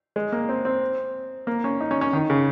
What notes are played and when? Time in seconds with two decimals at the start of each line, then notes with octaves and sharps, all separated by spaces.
0.16 G#3
0.32 A#3
0.49 C4
0.65 C4
1.47 A#3
1.64 C#4
1.81 D#4
1.91 C#4
2.01 C#4
2.13 D#3
2.30 C#3